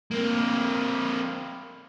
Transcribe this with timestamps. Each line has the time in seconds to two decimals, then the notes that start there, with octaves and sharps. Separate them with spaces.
0.11 A#3 C4